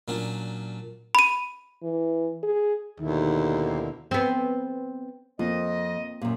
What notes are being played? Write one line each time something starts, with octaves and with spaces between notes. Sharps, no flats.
A#2 F#3 C#4 D4
B5 D#7
E3
G#4
D#2 B2 D3 D#3 E4
B3 C4
F2 A#3 C4 F4 D#5
F#2 A#2